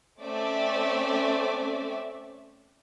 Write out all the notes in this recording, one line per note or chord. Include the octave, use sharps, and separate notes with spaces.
A3 C4 C#4 D5 E5